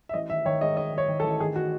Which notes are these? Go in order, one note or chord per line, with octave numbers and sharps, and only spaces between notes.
E5
A1 D#5
D#3 E5
D#3 C#5
G#2 D#5
G#2 D#5
D#3 C#5
D#3
A4
A1
D#3 G#4
F#4